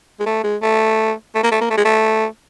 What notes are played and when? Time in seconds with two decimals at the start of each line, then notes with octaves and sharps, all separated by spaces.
0.20 G#3
0.26 A3
0.44 G#3
0.62 A3
1.35 A3
1.44 A#3
1.52 A3
1.61 A#3
1.70 A3
1.78 G#3
1.85 A3